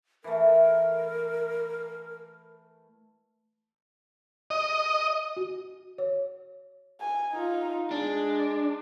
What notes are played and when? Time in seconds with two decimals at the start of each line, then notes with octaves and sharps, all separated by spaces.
0.24 E3 A3 A#4
4.50 D#5
5.37 F#4
5.98 C#5
7.00 G#5
7.32 D#4 F4
7.91 G#3 D4